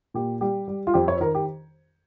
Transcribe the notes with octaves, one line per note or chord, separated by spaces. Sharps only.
A#2 G4
G3 G4
G3
F4
F2 G4
C#5
D#3 A#4
G4